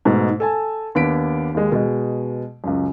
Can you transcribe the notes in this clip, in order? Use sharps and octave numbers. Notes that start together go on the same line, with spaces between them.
G#2 B2 A3
A4 G#5 A5
D#2 B3 D4 B6 D7
D#2 G#3
B2 G#3
C#2 F#2